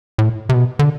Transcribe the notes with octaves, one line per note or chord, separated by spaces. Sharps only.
A2
C3
B2
D3